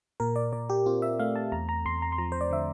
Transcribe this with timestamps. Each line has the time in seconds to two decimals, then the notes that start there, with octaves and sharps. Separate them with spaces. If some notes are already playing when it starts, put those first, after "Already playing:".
0.20 A#2 A#4
0.36 D5
0.53 A#2 D5
0.70 G4
0.86 C4 F4
1.02 E5
1.19 A3 F5
1.36 A5
1.52 E2 A#5
1.69 A#5
1.85 E2 C6
2.02 A#5
2.12 C6
2.18 F3 A#5
2.32 C5
2.41 D5
2.51 D3 E5